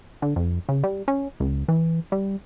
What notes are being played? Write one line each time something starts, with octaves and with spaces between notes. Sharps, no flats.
D3
F2
C#3
G3
C#4
C#2
E3
G3